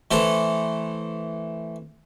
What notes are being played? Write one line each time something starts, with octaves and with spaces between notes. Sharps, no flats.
E3 A3 A4 C5